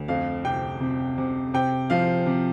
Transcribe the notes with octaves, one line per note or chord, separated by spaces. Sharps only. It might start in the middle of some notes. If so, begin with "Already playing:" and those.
Already playing: D2
F2 F5
C3 G5
C3
C3
C3 G5
F3 F5
C3